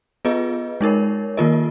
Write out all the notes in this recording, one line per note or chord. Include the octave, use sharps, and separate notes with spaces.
B3 F4 G#4 B4 D#5
G#3 D#4 A#4 C#5
D#3 A#3 F4 A#4 D#5